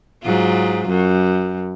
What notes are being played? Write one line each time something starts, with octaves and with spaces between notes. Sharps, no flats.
G#2 F#3 F4
F#2